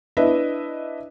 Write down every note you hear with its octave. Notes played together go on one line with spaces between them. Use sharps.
D4 E4 B4 D#5 E5